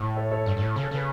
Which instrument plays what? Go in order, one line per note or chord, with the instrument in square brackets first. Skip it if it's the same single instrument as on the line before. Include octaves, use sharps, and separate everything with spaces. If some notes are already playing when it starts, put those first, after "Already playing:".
Already playing: [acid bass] A2
[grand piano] A4 C#5
A4 C#5
[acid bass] G2
G2
A2
C#3
[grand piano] A4
[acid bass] C#3 [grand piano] B4